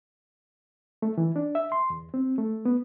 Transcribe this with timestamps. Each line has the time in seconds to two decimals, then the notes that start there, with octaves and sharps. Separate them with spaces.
1.02 A3
1.18 E3
1.36 D4
1.55 E5
1.72 C6
1.90 E2
2.14 C4
2.38 A3
2.65 B3